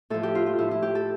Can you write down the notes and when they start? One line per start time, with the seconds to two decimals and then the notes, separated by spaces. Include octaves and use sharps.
0.10 A2 F3 A4
0.23 G4
0.35 F4
0.46 F4
0.58 A2 F3 E4
0.71 E4
0.83 G4
0.95 A4